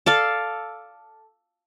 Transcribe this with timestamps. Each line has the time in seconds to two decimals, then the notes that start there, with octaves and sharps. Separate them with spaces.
0.06 A4 D5 F5